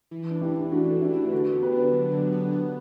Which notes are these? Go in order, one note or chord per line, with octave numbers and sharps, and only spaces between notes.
E3
D4
E4 G4
E3
A3 D4 F#4
E3 A4
E4 G4
D4
B4
D3 F#4 A4
B3
G4 B4
D4
F#3
D3
B3
B3